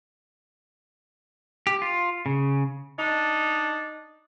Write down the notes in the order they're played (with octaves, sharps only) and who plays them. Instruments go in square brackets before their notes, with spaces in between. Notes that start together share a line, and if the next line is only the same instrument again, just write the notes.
[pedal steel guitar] G4
F4
C#3
[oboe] D4 [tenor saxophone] D#4